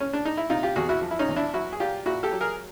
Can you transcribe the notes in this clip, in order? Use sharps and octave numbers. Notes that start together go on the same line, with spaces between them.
C#4
D4
D#4
E4
C3 D#4 F4
F4 G4
E2 F#4 G#4
E4 F#4
F3
E4
C#4 D#4
E2
D4 E4
F#3 E4 F#4
G#4
A#2 F4 G4
A#2 E4 F#4
G4 A4
F#3
G#4 A#4